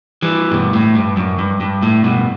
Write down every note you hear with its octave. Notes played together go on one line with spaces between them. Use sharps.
E3 G3
G2 B2
A2
G2
F#2
G2
G2
A2
G2 B2